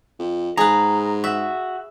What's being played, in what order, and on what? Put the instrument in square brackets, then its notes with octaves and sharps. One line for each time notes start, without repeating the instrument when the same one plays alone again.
[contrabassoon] F2
[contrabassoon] G#2 [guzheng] G#4 B4 [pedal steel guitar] A#5
[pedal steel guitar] F#4 [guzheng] E5